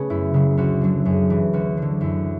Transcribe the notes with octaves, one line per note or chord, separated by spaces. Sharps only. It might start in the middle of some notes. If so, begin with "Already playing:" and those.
Already playing: C#3 A3 B3 C#4
F#2 E4
C#3 F#3
D2 F#4
D3 F#3
F#2 G#4
E3
D2 F#4
D3 F#3
F#2 E4